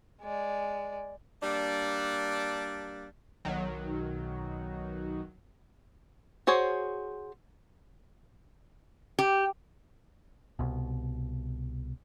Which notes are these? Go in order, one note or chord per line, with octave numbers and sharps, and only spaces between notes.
G#3 D5
G3 A#3 D4
B1 D#3 F#3
F#4 G#4 C5 C#5
G4
C2 B2